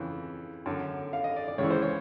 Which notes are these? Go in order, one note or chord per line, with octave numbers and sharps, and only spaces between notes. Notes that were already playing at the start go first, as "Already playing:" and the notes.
Already playing: F2 C#3 E3
F#2 D3
F5
D#5
D5
D5
C#2 C#3 E3 C#5
C5
C#5